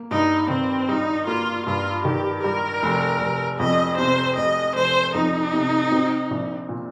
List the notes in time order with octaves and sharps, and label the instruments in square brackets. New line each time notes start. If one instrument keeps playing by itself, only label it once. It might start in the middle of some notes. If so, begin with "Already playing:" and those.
Already playing: [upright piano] A#3
[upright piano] G2 [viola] D#4
[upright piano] D#3 [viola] C4
[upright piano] G3 [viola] D#4
[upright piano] A#3 [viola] F4
[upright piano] G2 [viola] F4
[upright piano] D#3 [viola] G4
[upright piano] G3 [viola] A#4
[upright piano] F1
F1
[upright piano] F2 [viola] D#5
[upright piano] C3 [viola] C5
[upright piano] F1 [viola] D#5
[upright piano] F1 [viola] C5
[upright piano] F2 [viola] D#4
[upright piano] C3
C4
A#1
A#2